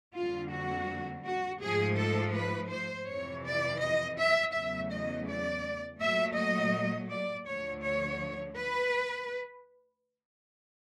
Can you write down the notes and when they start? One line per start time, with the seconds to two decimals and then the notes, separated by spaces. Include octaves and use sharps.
0.16 F2 D3 G3 A#3 F4
0.52 F#4
1.25 F#4
1.62 G#2 F3 A3 G#4
1.98 A4
2.35 B4
2.71 C5
3.08 F2 C3 E3 C#5
3.45 D5
3.81 D#5
4.17 E5
4.54 E2 C#3 F#3 A3 E5
4.90 D#5
5.27 D5
6.00 A#2 F#3 A3 E5
6.36 D#5
7.09 D5
7.46 D2 D3 F3 A3 C#5
7.82 C#5
8.56 B4